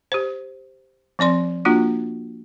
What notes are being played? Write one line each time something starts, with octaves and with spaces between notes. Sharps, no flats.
G4 C5
F3 C4 D5 C6
A#3 D4 F4 F#4